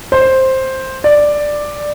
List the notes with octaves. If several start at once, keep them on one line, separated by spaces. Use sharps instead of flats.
C5
D5